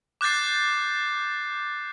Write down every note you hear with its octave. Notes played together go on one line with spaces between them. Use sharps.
D6 F#6 G6 A6 C7